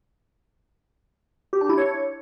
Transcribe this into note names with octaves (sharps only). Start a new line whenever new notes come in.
G4
D4
E4
C#5